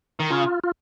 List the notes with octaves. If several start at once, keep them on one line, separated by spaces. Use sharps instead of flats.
D#3
C#3 F4
F4